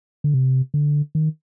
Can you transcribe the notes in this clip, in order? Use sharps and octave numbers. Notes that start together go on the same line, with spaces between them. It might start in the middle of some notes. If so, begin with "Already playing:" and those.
D3
C3
D3
D#3